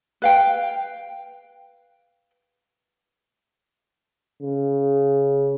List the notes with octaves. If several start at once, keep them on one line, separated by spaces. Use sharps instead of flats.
B4 F5 G5
C#3